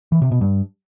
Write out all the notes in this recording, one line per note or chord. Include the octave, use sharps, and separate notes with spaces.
E3
C3
B2
G2